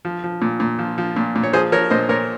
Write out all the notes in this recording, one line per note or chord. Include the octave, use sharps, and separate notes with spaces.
F3
F3
A#2
A#2
F3
F3
A#2
A#2
C#5
F3 G#4 C5
F3 A#4 C#5
A#2 C5 D#5
A#2 A#4 C#5